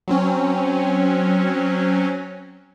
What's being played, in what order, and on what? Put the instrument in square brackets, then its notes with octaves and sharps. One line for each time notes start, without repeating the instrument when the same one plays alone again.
[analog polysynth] F#3 C4 C#4